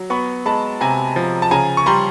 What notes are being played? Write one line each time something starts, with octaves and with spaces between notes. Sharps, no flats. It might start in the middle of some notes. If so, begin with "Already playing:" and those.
Already playing: F#3
B3 B5 C#6
G#3 A5 B5
C3 G#5 A#5
F3
A5
C#3 G#5 A#5
C#6
G3 A#5 C6